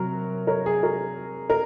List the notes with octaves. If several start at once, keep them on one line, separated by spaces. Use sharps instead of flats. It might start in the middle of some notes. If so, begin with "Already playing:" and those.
Already playing: C3 F#3 F#4 A#4
A#4 C#5
G#4
F#4 A#4
A#4